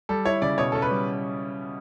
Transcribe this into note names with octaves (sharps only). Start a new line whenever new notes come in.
G3 A4
E4 C#5
C#3 D5
B2 C#5
C#4 A4
B4
G3